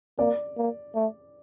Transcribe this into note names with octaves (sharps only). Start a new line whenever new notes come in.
A#3 D5
A#3
A3